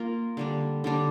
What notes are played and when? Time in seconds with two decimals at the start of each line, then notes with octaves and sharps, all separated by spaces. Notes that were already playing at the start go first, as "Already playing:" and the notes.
Already playing: A#3 F4 A#4
0.37 D3 G3 D4
0.84 D3 G3 D4